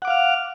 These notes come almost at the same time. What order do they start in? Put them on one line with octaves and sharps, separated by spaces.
F#5 D6 F5 F6